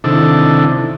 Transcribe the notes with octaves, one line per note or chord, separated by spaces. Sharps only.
C3 D#3 D4 E4 A4